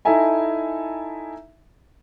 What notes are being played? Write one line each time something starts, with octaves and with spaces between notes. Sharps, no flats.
D#4 E4 A4 E5 G#5 A#5